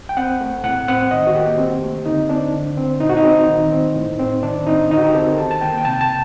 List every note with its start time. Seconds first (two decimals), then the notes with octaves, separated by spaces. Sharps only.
0.09 G5
0.17 C4 F#5
0.41 A3
0.64 A2 F#5
0.88 C4 F#5
1.11 D#3 D#5
1.27 F#4
1.34 A#3 G4
1.58 C4
1.83 A3
2.06 D3 D#4
2.29 C4 D4
2.54 D3
2.77 C4
3.00 A#2 D#4
3.09 F#4
3.17 D#4
3.25 C4
3.49 D#3
3.72 C4
3.96 A2
4.20 C4
4.43 D#3 D4
4.67 C4 D#4
4.90 D3 D#4
4.97 F#4
5.02 G4
5.14 C4 A4
5.27 A#4
5.37 D#3 A5
5.51 A5
5.61 A#3 G5
5.78 G5
5.85 C3 A5
5.93 G5
6.01 A5